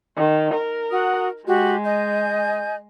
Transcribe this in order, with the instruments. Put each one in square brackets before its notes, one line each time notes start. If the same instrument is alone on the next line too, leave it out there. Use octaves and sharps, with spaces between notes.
[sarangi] D#3
A#4
[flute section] F#4 F#5 D#6
[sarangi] G#3 [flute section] F#4 G4
[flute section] D#5 G#5 G6